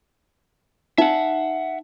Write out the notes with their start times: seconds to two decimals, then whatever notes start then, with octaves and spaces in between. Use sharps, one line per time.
0.98 D#4 E5 F#5